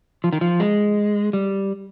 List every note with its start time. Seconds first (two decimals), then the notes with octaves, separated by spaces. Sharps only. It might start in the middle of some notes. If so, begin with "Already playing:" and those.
0.24 F3
0.33 D#3
0.41 F3
0.60 G#3
1.33 G3